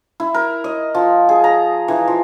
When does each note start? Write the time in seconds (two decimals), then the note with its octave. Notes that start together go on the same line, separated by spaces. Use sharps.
0.20 E4
0.34 A#4
0.64 D#5
0.95 F3
1.29 G#4
1.44 A#5
1.88 E3
2.08 F3